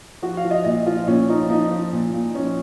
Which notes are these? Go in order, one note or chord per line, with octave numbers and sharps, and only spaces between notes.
F3 F#4
F5
F3
D#5
A#2 D#5
F3 F4
A#2 C#4
F3 D#4
F3 D#4
F3
A#2
A#2
F3 C#4